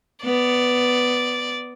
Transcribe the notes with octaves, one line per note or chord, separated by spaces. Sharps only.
B3 D5